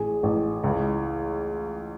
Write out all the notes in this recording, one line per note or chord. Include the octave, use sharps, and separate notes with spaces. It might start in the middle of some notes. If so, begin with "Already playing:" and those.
Already playing: A1 G#4
A1
C#2